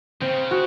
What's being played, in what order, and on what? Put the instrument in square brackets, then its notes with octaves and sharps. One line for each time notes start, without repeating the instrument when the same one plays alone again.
[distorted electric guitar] C#3 [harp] C4
[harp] F#4